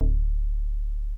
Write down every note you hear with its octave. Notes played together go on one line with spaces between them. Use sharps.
D1